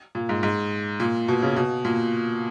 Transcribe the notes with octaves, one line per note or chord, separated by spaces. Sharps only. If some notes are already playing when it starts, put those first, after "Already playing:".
A#2
G#2
G#2
A#2
B2
C#3
B2
A#2